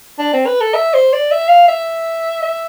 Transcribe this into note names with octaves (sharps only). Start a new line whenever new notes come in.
D4
C4
B4
A4
E5
C5
D5
E5
F5
E5
E5